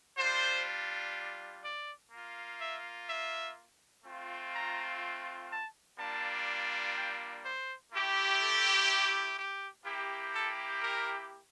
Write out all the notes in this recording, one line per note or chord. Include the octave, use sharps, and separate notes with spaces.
G3 D4 F4 C5
D5
A#3 F4
E5
E5
A3 C4 F4
A#5
A5
G3 A#3 D4 F4 A5
G5
C5
A3 E4 G4
A4
G4
A#3 E4 G4
A4
A#4